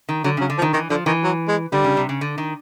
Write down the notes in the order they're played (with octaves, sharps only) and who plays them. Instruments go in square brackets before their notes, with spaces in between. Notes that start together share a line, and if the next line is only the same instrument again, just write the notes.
[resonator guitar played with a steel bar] D#3
[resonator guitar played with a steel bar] D3 [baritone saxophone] F#3
[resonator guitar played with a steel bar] C#3 [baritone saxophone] F#3
[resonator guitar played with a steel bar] D3
[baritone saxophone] F3
[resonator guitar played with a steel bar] D#3
[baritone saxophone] D#3 [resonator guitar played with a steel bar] E3
[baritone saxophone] D3 [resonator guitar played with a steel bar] F3
[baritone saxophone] D#3 [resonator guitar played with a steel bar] E3
[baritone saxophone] F#3
G#3
[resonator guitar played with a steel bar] D3 [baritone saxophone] G3
[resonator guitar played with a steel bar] C#3
C3
C#3
D3
D#3